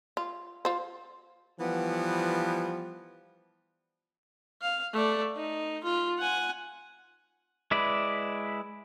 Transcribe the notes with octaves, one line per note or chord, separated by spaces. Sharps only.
F4
F4 C5
E3 F3 G3 B3
F5
A3 D5
D#4
F4
F#5 G#5
G#3 E4 B4 D5